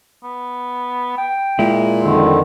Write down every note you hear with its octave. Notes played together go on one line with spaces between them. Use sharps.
B3
G5
A#2 G#3 E4
F2 D3 D#3 C4